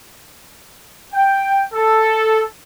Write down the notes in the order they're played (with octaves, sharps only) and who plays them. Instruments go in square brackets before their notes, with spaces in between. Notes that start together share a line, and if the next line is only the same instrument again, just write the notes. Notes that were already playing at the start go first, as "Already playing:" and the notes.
[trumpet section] G5
A4